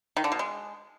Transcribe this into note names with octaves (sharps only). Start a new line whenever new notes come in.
D#3
D3
B2
G#3